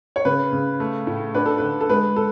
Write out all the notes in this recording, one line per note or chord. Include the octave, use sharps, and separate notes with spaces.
C#5
C#3 B4
C#3
A3
A2
D4 B4
A4
D3 B4
A4
G#3 B4
A4